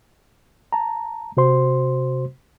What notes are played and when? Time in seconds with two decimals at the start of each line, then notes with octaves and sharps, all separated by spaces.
0.72 A5 A#5
1.37 C3 F#4 C5 C6